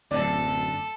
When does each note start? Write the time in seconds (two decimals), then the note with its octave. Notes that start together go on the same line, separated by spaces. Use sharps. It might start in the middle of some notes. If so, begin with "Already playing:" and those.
0.11 D1 F#2 D3 A4 D5